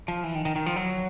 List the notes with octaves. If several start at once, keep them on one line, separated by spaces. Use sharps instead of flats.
F3
E3
D#3
D#3
D#3
F3
F#3